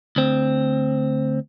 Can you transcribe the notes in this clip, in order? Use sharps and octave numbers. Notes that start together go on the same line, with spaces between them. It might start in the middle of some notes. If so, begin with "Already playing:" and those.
D2 C4